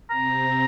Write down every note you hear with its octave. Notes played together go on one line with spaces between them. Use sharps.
C3 C4 A#5